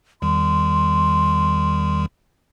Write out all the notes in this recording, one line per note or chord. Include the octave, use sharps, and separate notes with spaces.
E2 D#3 G3 C6